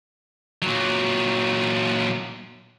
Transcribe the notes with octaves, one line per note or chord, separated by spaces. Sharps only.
A#2 F#3